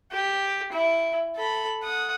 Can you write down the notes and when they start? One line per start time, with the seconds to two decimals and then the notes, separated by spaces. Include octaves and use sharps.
0.12 G4
0.72 E4
1.36 A4 B5
1.84 F#5 D#6